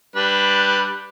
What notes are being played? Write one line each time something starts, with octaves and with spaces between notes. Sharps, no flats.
G3 D4 B4